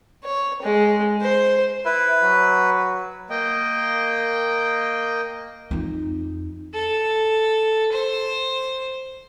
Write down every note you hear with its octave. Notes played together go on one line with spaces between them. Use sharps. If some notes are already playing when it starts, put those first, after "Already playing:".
C#5
G#3
C5
E4 B4
F#3
A#3 D#5 G5
F2 D#4
A4
C5